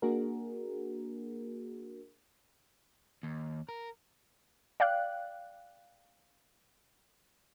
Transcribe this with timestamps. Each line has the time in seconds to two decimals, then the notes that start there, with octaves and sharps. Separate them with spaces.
0.02 A#3 D4 F#4 G#4 A#4
3.23 D#2
3.69 A#4
4.80 D5 F5 G5 F#6